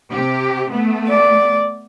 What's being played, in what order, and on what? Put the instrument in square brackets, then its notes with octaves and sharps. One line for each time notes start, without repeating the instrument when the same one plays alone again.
[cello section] C3 G4
A3 B3
[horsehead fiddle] D5